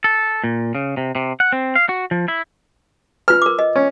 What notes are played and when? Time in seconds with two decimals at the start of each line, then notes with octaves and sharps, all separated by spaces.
0.04 A4
0.44 A#2
0.75 C#3
0.97 C3
1.15 C3
1.40 F#5
1.52 C4
1.75 F5
1.89 F#4
2.11 F3
2.28 E4
3.28 F4 B4 F6
3.42 A#4 D6
3.59 D#5
3.76 C#4